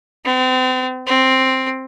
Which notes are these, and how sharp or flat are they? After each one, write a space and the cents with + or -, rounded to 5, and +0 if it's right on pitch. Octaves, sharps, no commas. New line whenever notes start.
C4 -35
C4 +5